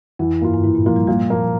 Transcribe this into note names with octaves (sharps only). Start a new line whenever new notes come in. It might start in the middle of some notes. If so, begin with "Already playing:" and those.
F2 E3
G2 A#3 F4
G2
G#2 E3
A#2
F3 A#3 F4
G3
A#2 G3
F3 A#3